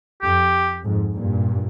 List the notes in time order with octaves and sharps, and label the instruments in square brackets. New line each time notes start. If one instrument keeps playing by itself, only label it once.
[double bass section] F2 [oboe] G4
[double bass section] F2 G#2
G2 A#2